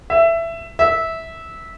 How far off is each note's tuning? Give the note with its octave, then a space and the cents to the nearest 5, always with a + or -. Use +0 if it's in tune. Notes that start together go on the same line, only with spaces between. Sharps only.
E5 +15
E5 -15